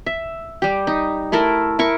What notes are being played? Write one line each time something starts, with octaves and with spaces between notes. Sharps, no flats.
E5
G3 G4
D#4
A3 E4 A4 A#4
E4 A#4 C#6